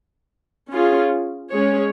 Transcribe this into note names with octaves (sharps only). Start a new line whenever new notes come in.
C#4 F4 G#4
G#3 C#4 G#4 C#5